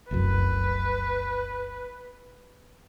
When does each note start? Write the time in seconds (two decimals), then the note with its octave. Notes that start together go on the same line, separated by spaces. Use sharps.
0.11 F1 C2 F#2 B4